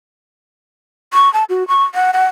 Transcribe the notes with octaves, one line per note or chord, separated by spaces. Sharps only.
C#6
A5
F#4
C#6
F#5
F#5